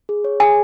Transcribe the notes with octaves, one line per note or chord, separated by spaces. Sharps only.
G#4
C#5
G#4 G#5